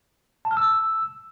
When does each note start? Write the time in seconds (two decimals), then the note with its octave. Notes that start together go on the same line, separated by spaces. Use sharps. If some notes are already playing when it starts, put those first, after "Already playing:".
0.45 A5
0.51 F6
0.57 E6